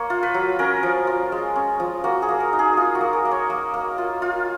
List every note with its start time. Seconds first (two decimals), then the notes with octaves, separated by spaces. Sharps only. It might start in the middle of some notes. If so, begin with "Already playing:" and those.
Already playing: A#3 C#5
0.10 F4
0.23 B4
0.34 F#3
0.59 C#4 A#4
0.83 F3
1.07 F4
1.32 G#3
1.56 C#4
1.80 F3
2.04 A#3 F#4
2.22 G#4
2.29 A#3
2.40 A#4
2.53 D#4
2.59 G#4
2.77 D#4 F4
2.95 F#4
3.01 A#3
3.13 A#4
3.25 A#3
3.31 C#5
3.50 A#3
3.74 A#3
3.98 F4
4.22 F4